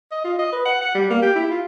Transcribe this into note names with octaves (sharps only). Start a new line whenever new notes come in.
D#5
F4
D#5
B4
F#5
F#5
G3
A#3
G4
E4
F4